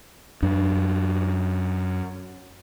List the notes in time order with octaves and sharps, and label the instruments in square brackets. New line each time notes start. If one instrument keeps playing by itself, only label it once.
[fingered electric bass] F#2 D4